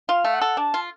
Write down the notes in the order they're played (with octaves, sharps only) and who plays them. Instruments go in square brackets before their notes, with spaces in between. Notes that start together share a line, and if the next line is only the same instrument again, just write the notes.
[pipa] F4 [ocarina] F5
[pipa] A3
[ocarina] F#5
[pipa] A4
[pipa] D4 [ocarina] A5
[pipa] F4